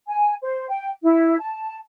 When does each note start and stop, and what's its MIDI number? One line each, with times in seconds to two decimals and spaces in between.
0.07 0.33 80
0.42 0.66 72
0.68 0.89 79
1.02 1.35 64
1.39 1.77 81